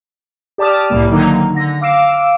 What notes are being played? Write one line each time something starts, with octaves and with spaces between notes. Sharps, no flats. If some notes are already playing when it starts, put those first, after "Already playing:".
G4 D5 A5 D6 D#6 F6
C2 A2 C3 G3 A#3
D3 D#3 F#3 A#3 D#4
D3 A#6
F5 D6 E6 D7 E7